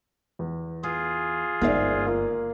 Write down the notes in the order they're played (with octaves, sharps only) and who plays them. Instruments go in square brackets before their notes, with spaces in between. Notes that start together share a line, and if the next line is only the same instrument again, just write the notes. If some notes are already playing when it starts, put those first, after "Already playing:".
[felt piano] E2
[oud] B3 [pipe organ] F4 G#4
[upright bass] G1 [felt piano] G#2 [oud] A#4 D5 E5
[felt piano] A#3 F4